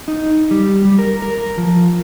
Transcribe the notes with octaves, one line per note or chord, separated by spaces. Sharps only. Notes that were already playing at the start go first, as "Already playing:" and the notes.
D#4
G3
G3
A#4
A#4
F3